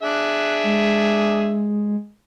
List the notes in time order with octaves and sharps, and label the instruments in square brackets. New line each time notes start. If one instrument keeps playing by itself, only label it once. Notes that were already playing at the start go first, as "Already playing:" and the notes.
[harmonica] D4 G#4 E5 [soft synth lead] F#6
[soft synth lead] G#3